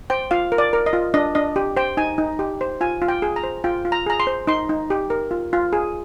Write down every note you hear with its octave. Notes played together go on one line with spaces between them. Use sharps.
C5 G5
F4 F5
A#4
D5
A#4
D#5
F4
D4 D#5
D4 D#5
G4
C5 G5
D#4 G#5
D#4
G4
C5
F4 G#5
F4
G5
G#4
A#5
C5
F4 G5
F4
A#5
G#4 A#5
C6
C5
D#4 C6
D#4
G4
A#4
F4
F4
G#4